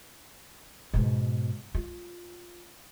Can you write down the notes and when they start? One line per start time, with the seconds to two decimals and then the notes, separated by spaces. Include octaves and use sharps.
0.94 G#2 B2
1.75 F4